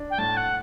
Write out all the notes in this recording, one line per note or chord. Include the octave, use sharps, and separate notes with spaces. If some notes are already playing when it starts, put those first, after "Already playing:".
Already playing: D4
G5
A2 A5
F#5